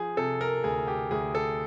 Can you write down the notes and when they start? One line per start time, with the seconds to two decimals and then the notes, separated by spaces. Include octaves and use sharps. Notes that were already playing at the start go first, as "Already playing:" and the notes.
Already playing: F3 G#4
0.17 C3 A4
0.41 A#4
0.64 D2 G#4
0.88 G4
1.11 D2 G#4
1.35 A4